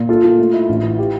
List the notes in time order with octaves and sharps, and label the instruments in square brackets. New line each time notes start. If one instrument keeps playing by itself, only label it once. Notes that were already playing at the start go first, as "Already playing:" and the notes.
Already playing: [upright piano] A#2
[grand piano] F4 [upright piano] A4
[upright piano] A#2
A3
E4
A1
E3
G4